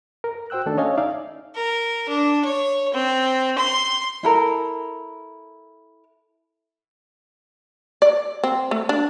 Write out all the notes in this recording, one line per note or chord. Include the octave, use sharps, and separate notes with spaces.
A#4
F#4 C5 G5 E6 F#6
D#3 A3 D4 A4 A5
C#4 C#5 D#5 F5 G#5
D#4 D5 E5 F5
A#4
D4
C#5
C4
C6
E4 A4 A#4
D5
C4
A3
D4